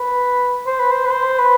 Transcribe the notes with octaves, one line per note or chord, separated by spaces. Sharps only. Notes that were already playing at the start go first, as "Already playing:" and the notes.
Already playing: B4
C5
B4
C5
B4
C5
B4